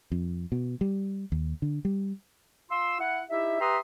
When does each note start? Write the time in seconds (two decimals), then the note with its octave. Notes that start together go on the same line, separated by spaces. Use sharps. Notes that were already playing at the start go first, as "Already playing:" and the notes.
0.12 F2
0.52 B2
0.81 G3
1.32 D#2
1.62 D3
1.85 G3
2.71 F4 C6 E6
3.00 E4 F#5
3.30 D#4 E4 G4 E5
3.60 G4 B4 E5 A#5 C6 D#6